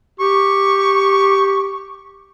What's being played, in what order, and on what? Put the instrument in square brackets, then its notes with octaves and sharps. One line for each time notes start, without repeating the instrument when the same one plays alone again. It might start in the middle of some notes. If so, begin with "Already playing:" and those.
[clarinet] G4 [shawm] C#6